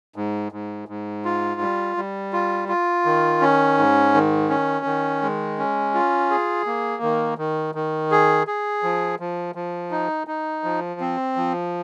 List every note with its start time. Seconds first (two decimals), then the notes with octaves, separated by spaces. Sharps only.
0.16 G#2
0.52 G#2
0.88 G#2
1.25 F4
1.61 G3
1.97 G3
2.33 F4
2.69 F4
3.05 D#3
3.41 C#4
3.78 G#2
4.14 D#3
4.50 C#4
4.86 D#3
5.22 G#3
5.58 C#4
5.94 F4
6.30 G#4
6.66 A#3
7.03 D#3
7.38 D#3
7.75 D#3
8.11 G#4
8.47 G#4
8.83 F3
9.19 F3
9.55 F3
9.91 D#4
10.27 D#4
10.64 F3
11.00 C4
11.36 F3